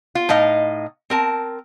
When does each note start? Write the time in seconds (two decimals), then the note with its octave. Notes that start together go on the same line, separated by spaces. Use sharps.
0.15 F4
0.29 A2 D#4 D#5 F5
1.10 C4 A#4 A5